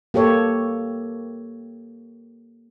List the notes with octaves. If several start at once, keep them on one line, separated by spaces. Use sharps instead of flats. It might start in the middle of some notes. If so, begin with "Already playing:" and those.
A#3 G4 A4 C#5